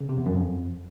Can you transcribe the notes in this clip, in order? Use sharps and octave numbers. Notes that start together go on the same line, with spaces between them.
C#3
C3
E2
F#2
F2